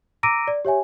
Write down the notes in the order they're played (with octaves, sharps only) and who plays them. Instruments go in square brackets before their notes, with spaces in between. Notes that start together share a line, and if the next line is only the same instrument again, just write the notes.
[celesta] A#5 D6 E6 A#6 D7 D#7
D5
G4 C#5 E5 G#5